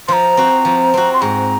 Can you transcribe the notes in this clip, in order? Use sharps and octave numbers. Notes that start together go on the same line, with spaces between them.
F3 A#5 C6
C4 F#4
F3
C4 F#4
C6
G#2 A#5